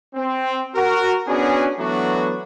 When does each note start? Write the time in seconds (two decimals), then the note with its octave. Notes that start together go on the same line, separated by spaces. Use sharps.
0.15 C4
0.75 F#4 A#4
1.27 B3 C#4 D4 F#4 G#4
1.79 E3 F#3 A3 B3 D4 F#4